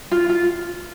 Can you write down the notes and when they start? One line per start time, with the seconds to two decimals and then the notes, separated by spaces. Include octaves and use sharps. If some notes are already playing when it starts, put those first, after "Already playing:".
0.11 F4
0.29 F4